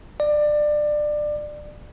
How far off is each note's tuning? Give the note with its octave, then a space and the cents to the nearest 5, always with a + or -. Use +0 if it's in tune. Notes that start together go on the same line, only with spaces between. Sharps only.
D5 +20